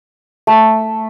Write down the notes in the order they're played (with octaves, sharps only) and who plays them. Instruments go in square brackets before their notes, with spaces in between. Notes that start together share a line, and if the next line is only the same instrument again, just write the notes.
[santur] A3